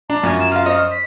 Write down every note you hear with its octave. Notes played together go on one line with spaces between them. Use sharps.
D4 A#5
F#2 F4 G#5
E7
F4 F5 F6
C5 C#5 D#5
B6